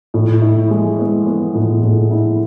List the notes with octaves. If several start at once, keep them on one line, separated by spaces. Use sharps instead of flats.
A2
E4
G#3
B3
B3
A2
A2
E4